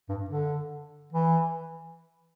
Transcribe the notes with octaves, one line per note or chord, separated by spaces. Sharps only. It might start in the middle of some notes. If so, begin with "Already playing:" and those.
G2
D3
E3